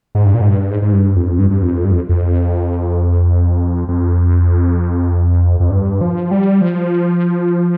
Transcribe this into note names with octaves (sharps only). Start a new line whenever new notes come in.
G#2
G2
A#2
G#2
G2
G#2
G#2
G2
F2
G2
G2
F2
G2
F2
F2
F2
F2
G2
F3
G3
F3